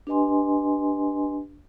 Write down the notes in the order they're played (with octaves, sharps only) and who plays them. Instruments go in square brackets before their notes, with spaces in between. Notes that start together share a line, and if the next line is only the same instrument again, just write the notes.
[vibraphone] D4 G4 B4 D#5 G#5 C6